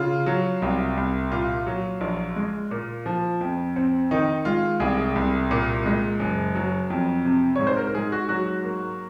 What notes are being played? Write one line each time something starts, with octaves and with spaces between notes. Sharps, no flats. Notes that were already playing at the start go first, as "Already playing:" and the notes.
Already playing: C#3 F4
F#3
C2
C2
A#2 F4
F#3
A#1
G#3
A#2
F3
F2
C4
D#3 D#4
G#3 F4
C2 G#4
C2
A#2
G#3
F#1
F#3
F2
C3
G#2 C#5
C5
A#4
A#4
G#2 G#4
F#4
F#3 F#4
A#3